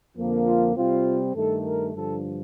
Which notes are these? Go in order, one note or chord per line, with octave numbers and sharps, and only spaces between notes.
F2 D3 F3 A#3
F4
C3 G3 C4 F4
G2 D#3 A3 A4
A#4
G2 D3 F3 A4